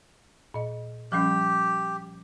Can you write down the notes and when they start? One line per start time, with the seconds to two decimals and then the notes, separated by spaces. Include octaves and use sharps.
0.54 A#2 D#5
1.12 F3 G3 C#4 G4